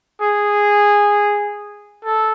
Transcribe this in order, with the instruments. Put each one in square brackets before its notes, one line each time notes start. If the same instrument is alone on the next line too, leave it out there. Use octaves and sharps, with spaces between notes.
[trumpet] G#4
A4